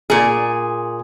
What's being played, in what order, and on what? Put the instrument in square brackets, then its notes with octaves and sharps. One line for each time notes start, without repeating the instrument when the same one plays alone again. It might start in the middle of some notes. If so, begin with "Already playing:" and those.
[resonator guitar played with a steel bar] A#2 G#4